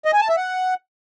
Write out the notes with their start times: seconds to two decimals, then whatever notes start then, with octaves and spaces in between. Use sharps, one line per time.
0.05 D#5
0.13 G#5
0.21 A5
0.29 E5
0.36 F#5